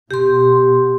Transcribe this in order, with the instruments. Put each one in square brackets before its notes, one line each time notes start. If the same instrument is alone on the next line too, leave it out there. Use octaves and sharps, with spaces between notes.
[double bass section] B2 [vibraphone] G4 C6